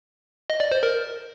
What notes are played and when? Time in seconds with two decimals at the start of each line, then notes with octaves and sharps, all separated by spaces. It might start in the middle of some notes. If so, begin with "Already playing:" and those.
0.50 D#5
0.60 D5
0.71 C5
0.83 A#4